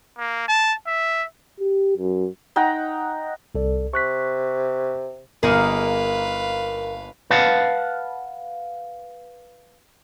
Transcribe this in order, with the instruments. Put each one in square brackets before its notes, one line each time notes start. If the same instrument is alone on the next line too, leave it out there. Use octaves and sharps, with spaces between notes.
[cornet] A#3
A5
E5
[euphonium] G4
F#2
[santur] D#4 F#5 G5 A#5
[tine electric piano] C2 A4 D5
[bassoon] C3 [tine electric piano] C#6 F#6 B6
[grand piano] G1 [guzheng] A#3 D#4 G#4 [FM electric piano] A#4 [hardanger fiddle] B4 F5
[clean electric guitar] B4 F5 F#5 A5